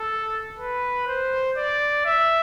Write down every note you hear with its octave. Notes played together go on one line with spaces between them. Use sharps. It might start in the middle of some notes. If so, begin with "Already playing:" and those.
Already playing: A4
B4
C5
D5
E5